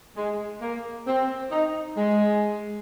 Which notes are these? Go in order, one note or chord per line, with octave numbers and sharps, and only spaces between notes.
G#3
A#3
C4
D#4
G#3